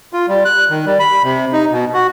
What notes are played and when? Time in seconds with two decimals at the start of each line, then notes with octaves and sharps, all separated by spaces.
0.13 F4
0.28 G3
0.45 F#6
0.70 D#3
0.86 G3
0.99 B5
1.24 C3
1.53 D#4
1.72 B2
1.94 F#4